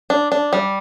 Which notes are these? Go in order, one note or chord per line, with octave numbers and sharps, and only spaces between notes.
D4
D4
G3